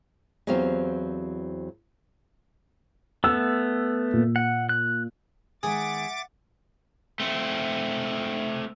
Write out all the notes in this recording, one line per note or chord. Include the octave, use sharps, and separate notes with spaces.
E2 F#3 C4 G4 C5 F5
A3 B3 E6
A#2
F#5
F#6
D#3 G#3 B3 G#4 E5 F#5 D6 A6
A3 C4